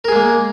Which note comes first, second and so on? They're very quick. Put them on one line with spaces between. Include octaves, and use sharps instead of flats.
A#4 G#4 G#3 A#3